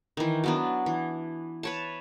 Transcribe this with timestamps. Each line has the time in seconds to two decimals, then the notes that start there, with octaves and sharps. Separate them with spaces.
0.17 D#3 E3
0.44 F#3 B3 D4
0.86 E3
1.63 B4 C#5 A5